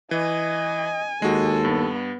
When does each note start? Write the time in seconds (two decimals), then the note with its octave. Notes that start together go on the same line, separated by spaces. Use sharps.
0.11 E3 D#5 G#5
1.22 D#2 G#3 F#4 A4
1.65 G2 B3